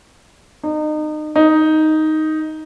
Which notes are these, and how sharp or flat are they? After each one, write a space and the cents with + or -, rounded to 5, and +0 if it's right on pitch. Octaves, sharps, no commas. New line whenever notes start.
D#4 -30
D#4 +5